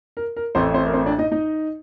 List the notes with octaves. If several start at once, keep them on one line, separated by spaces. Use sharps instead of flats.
A#4
A#4
A1 A2 A3 C4 C5
C4 C5
A#4
C4 C5
D4 D5
D#4 D#5
D#4 D#5